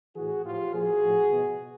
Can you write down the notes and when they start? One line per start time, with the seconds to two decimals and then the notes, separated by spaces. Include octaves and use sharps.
0.16 A2 E3 F#4 G#4
0.45 A2 F3 F4 G4
0.74 A#2 F3 F#4 G#4
1.04 A2 F3
1.32 B2